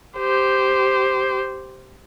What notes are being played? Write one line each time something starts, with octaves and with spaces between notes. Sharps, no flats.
G4 C5